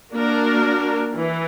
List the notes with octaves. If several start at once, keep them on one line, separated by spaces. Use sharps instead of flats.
A#3 D4 F#4 A#4
E3